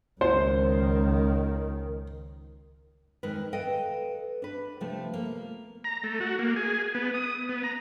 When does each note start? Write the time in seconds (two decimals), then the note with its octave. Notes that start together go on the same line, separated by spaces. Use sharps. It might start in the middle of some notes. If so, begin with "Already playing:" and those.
0.21 C#2 D#3 C5
3.23 F2 D#3 G#3 D#4 A#4 B4
3.53 A4 B4 D#5 F5 G5
4.42 D4 B4
4.81 C3 F3 A3
5.14 A#3
5.84 A#5
6.04 A3
6.20 F#4
6.39 A#3
6.56 G#4
6.95 B3
7.14 D#6
7.49 B3
7.63 A#5